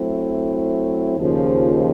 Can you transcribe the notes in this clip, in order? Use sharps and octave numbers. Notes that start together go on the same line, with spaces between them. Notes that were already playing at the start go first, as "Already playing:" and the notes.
Already playing: F#3 A3 C4 E4
D#2 C#3 F3